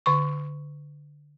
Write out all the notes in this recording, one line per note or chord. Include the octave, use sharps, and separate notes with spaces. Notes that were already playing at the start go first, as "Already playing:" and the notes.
D3 C#6